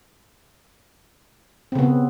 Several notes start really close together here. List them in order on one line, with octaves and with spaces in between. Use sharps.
C4 C#3 B3